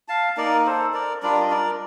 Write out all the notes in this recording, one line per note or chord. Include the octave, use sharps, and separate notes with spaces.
F5 A5
A#3 D#4 A#4 D5
A4 C5
A#4 D5
G3 D4 F4 A#4 D5
D#5
A#4 D5